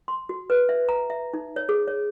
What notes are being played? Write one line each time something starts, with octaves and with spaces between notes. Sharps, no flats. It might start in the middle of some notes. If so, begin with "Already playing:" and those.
C6
F#4
B4
E5
A#5
E5
D#4
C#5
G#4
C#5